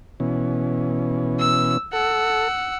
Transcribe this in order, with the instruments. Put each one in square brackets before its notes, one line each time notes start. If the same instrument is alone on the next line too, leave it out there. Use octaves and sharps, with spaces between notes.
[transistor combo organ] B2 E3 C#4
[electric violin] E6
[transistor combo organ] A4 [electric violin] F#5 E6